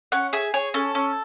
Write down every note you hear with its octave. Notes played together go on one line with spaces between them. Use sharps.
C#4 F#5
G#4 E5
G#4 C#5
C#4 A4
C#4